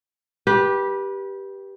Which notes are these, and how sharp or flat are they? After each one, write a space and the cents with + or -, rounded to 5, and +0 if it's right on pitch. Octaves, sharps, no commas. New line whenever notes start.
G4 +0 B4 -25